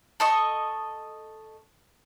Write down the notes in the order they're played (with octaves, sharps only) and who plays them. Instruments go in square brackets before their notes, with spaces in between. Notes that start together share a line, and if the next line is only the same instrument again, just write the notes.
[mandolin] A4 D#5 C#6